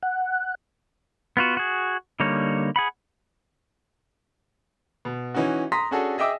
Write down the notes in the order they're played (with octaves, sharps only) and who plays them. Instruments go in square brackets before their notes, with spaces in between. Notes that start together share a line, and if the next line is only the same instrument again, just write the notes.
[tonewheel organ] F#5
[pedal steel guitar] B3 F4 F#4
F#4 G#4
D3 G3 A#3 D#4 C#5
G#4 F#5 B5
[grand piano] B2
E3 C#4 D#4 F#4
A#5 C6 D#6 A#6 B6
C#4 D4 F#4 G#4 A4
G#4 D#5 E5 G5 D6 E6